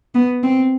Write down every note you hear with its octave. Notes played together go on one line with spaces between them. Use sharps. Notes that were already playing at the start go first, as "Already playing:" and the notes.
B3
C4